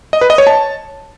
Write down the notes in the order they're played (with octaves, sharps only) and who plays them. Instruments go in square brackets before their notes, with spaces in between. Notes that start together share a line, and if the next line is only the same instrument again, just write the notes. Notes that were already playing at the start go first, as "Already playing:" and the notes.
[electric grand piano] D#5
B4
D#5
C#5
A5